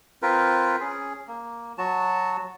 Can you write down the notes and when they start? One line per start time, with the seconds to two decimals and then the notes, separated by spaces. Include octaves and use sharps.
0.22 C4 F4 A#4 B4
0.81 C#4 G#4
1.28 A#3
1.78 F#3 F#4 A5